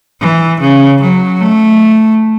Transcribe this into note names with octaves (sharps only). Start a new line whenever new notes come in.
E3
C#3
F#3
A3